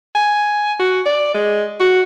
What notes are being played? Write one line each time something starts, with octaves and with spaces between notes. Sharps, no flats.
G#5
F#4
D5
G#3
F#4